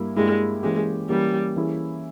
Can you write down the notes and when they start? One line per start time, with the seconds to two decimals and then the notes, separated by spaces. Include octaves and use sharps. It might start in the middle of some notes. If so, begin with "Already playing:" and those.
Already playing: G2 G3 A#3 E4
0.17 G2 G3 G#3 A#3 E4
0.63 E3 G#3 A#3 C#4 G4
1.09 E3 G3 A#3 C#4 G4
1.56 E3 A#3 C#4 E4 G#4